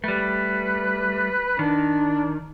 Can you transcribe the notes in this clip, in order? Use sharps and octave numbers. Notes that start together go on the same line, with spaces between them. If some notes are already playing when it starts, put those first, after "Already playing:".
G3 A3 B4
D#3 D4